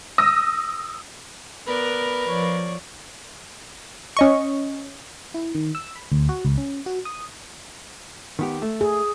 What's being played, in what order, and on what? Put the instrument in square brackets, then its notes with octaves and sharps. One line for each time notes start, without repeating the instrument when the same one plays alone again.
[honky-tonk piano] D#6 E6 A#6
[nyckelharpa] B3 D5 [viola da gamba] A#4 [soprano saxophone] B4
[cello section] F3 [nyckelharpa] C#5 D5
[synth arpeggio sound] C#4 D#5 C#6
[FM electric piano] E4
D#3
E6
B5
D2
F#4
C#2
C#4
F#4
D#6
[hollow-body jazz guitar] D#3 B3 G4
A3
[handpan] G#4